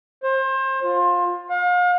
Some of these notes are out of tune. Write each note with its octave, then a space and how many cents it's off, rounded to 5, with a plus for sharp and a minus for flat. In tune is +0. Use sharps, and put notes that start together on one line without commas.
C5 +30
F4 +20
F5 +40